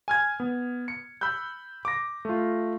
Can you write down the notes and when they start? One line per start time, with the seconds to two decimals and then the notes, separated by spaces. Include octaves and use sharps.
0.08 G#5 F6 G#6
0.40 B3
0.88 C#7
1.21 B5 E6 F#6 G6
1.85 D6 A#6
2.25 A3 F4